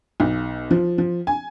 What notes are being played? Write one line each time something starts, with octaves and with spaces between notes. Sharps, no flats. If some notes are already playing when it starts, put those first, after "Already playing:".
B1
F3
F3
G#5